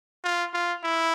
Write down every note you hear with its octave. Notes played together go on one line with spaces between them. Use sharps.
F4
F4
E4